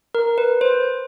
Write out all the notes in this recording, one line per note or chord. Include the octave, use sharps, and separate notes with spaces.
A#4
B4
C5